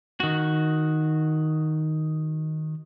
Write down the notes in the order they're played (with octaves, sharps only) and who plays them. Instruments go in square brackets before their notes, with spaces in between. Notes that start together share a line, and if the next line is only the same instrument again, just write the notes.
[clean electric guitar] D#3 F#4